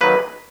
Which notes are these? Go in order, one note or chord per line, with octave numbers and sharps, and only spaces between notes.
D#3 F#3 A#3 B4